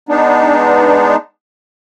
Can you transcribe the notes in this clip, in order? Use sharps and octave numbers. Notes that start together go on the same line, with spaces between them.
G#3 B3 D4 D#4